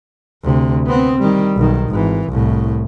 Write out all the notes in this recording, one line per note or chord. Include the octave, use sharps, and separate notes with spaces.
D2 C3
B3 C4
D#3 G3
B1 D#3
G#1 E3
C2 A2